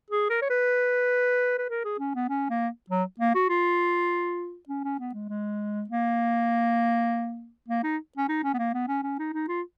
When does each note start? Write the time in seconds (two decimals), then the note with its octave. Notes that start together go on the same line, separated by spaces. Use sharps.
0.10 G#4
0.30 A#4
0.42 C#5
0.50 B4
1.58 B4
1.70 A#4
1.85 G#4
1.99 C#4
2.15 B3
2.29 C#4
2.50 A#3
2.90 F#3
3.19 A#3
3.35 F#4
3.49 F4
4.69 C#4
4.84 C#4
4.99 B3
5.14 G#3
5.29 G#3
5.89 A#3
7.68 A#3
7.84 D#4
8.18 C#4
8.29 D#4
8.43 C#4
8.54 B3
8.59 A#3
8.74 B3
8.88 C#4
9.03 C#4
9.19 D#4
9.33 D#4
9.48 F4